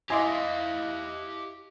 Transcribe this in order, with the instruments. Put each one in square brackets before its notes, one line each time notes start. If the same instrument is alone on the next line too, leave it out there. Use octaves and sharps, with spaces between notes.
[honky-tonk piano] E4 D#5 [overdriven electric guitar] G4 F5 [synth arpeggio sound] G#5 C6 D6